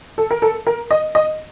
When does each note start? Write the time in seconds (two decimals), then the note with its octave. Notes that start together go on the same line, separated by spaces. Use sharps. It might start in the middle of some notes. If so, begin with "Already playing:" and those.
0.18 A4
0.31 A#4
0.42 A4
0.67 A#4
0.91 D#5
1.15 D#5